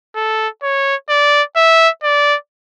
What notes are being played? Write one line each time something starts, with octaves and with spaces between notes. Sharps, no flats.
A4
C#5
D5
E5
D5